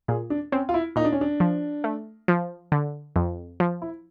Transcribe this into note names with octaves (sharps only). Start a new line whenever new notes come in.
A#2 G#4
D4
C4 C#4
F4
E4
A#2 D#4
D4
C#4
D4
F3
A3
F3
D3
F2
F3
E4